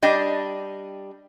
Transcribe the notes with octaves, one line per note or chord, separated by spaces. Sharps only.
G3 D4 D#5 G5